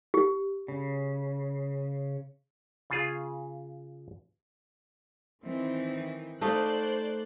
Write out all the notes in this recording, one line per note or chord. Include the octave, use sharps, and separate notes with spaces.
G4
C#3
C#3 F4 G#4
D#3 E3 C4
A3 D#4 C5 D5 F5 F#6